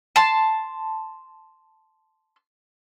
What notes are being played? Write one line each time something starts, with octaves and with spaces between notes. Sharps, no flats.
A5 C6